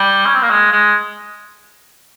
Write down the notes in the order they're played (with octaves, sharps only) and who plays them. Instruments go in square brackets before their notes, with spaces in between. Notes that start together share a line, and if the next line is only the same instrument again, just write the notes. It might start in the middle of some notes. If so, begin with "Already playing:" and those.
Already playing: [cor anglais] G3
C#4
C4
A#3
G#3
G#3